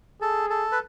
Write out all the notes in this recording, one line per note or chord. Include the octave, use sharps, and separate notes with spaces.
G#4 A4
A4
B4